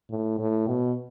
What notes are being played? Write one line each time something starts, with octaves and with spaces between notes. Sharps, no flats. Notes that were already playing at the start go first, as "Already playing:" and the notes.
A2
A2
B2